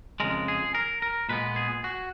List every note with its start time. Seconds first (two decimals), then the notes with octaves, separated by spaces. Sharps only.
0.20 F2 C#3 G#3 A#4
0.48 G#4
0.75 A#4
1.02 A#4
1.29 A#2 G#3 B3 B4
1.56 G#4
1.84 F#4